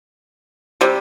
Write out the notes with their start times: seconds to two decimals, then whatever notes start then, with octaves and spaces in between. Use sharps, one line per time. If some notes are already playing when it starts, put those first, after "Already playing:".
0.81 C3 G3